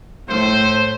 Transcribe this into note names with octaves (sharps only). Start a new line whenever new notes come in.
A2 C5